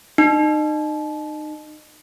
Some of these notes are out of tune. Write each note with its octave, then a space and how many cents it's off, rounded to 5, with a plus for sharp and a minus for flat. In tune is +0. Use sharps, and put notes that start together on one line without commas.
D#4 -30